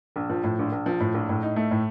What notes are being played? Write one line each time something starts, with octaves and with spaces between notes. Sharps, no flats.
A#1
F3
A2
A#1
A#1
F3
A2
A#1
A2
D#4
A3
A2